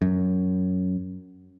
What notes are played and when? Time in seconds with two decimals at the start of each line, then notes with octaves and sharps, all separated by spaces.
0.02 F#2